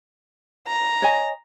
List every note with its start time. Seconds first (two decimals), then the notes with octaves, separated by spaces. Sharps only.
0.67 A#5
1.02 C#5 D#5 G#5